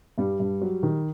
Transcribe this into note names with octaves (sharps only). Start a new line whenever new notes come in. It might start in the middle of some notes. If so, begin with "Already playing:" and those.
G2 G3
G2
F#3
D#3